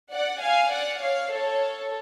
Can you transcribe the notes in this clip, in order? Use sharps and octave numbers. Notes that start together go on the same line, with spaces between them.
D5 F#5
F5 G#5
D5 F#5
C#5 F5
A4 C#5